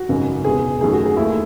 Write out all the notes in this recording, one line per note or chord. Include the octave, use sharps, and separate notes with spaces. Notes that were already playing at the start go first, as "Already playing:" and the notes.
Already playing: F#4
G#1 F#2 C#3 G#3
E1 E2 C3 E3 G#4
F#2 D#3 A3 G#4
F#4
G#4
D#2 D#3 A3 E4